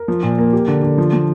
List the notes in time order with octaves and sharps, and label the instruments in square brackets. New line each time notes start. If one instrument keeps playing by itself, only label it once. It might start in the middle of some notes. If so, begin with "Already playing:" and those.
Already playing: [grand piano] A#4
F3
A#2
A#3
G4
D3
D3
F3
F3